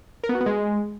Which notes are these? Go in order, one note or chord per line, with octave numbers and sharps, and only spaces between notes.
A#4
B3
F#4
B3
G#3